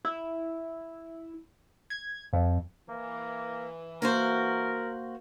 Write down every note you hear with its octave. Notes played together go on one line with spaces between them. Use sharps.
E4
G#6
F2
E3 A#3
A#3 F#4 A#4 C5